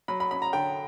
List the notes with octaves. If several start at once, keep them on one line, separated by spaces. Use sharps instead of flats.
F#3 B5
B5
C#4 B5
A#5
D3 G5